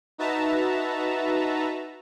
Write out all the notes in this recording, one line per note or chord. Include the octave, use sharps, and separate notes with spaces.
D#4 F#4 B4 E5 A5 A#5